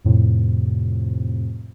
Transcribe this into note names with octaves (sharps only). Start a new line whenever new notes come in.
F2 A2 C3